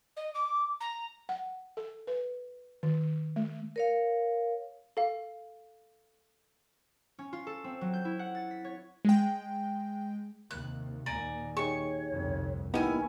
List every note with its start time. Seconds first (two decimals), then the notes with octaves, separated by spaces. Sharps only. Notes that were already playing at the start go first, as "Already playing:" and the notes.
0.17 D#5
0.34 D6
0.80 A#5
1.29 F#5
1.77 A4
2.07 B4
2.83 D#3
3.36 A3
3.76 A#4 C#5 F5
4.97 A4 F5
7.19 C#4
7.33 F4
7.47 A4
7.64 C4
7.81 F#3
7.93 G6
8.05 E4
8.19 F#5
8.35 A6
8.51 B6
8.64 C#5
9.05 G#3 G5
10.51 D#2 C3 F#6
11.06 D#2 A#2 D5 G#5 A#5
11.57 D#4 G4 G#4 C#5 C#6
12.12 G1 C2 F2
12.74 A1 A#3 B3 C#4 D#4 E4 G4 G#5